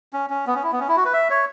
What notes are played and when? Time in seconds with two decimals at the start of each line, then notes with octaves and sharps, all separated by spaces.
0.13 C#4
0.30 C#4
0.47 B3
0.55 C#4
0.63 E4
0.72 B3
0.80 C#4
0.88 E4
0.96 F#4
1.05 B4
1.13 E5
1.30 C#5